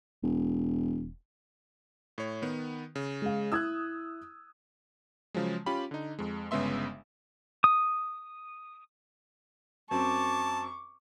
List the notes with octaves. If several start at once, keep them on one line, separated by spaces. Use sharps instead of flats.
E1
A2 C#5
D#3 B3
C#3
G#3 F5
E4 D#6 E6 F#6 G#6
C#3 F3 F#3 G#3
C#4 F4 G4 B5
D3 D#4
F2 G#3
G1 C#3 G#3 B3 E5 C6
D#6
F#2 C4 A5 C#6 D6